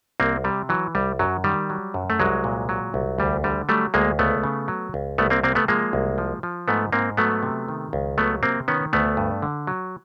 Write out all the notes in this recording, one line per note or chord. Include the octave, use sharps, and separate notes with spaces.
C2 A#3 C4
C3 G3
E3 F#3
C2 G3
F#2 F#3
D#3 G3
F#3
F#2
A3
C2 F#3 G#3
A#2
F#3
C2
D2 G3
D3 G3
F#3 G3 A3
D2 G#3 A#3
C#2 A3 B3
C#3
F#3
C#2
C2 A3 B3
A#3 C4
C3 A#3 C4
A3 B3
F3 G#3 A#3
C2
F3
F3
G#2 A3 B3
G#2 A#3 C4
F#3 A3 B3
C3
D#3
C#2
F#3 A3 B3
C3 A#3 C4
D#3 B3 C#4
D2 A3 B3
G2
D3
F#3